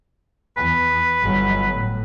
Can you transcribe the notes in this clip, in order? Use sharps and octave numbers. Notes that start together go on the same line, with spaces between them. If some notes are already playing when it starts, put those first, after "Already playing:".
E2 B4
G1 F#3
A2